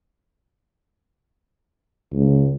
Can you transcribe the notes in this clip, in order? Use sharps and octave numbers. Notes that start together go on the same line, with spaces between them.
C#2